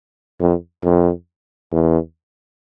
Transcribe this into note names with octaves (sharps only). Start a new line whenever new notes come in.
F2
F2
E2